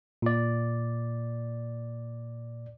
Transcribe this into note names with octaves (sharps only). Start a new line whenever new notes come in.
A#2 D5